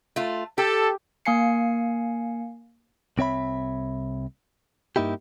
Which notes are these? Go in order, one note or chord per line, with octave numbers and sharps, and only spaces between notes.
A3 F4
G4 A4
A#3 F5 G#5 C7 C#7
C2 C4 C#5 E5 B5
G2 A#3 D#4 E4 G4